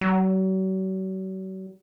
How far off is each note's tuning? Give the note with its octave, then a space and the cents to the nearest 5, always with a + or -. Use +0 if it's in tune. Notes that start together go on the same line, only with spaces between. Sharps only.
F#3 +40